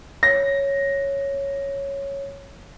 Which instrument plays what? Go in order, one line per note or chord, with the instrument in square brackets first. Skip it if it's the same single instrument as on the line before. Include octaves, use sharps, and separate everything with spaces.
[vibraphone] C#5 [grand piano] A#6